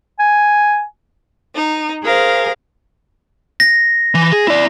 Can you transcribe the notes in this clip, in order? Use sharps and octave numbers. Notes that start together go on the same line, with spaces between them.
G#5
D#4
G#4 A#4 C5 F5
A#6
E3
G#4
E4 D5